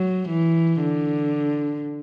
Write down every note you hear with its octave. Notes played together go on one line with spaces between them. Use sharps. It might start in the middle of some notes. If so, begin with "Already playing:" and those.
Already playing: F#3
E3
D3